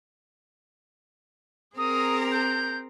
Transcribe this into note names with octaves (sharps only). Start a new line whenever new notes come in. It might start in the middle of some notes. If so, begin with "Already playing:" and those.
C4 G#4 A#4 A#5 D#6
G6